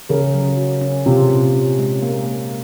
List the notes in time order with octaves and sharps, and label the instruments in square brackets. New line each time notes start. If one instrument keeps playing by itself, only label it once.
[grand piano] C#3 [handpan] A#4
[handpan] F#3
F#4
C#4
[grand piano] C3 [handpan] F4
[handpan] A#2
C#4
G#3
A#3
A#3